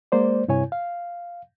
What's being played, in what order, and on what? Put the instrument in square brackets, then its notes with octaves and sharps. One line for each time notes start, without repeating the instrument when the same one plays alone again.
[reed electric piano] G#3 A#3 C5 D5
G2 C3 E4 C#5 G#5
F5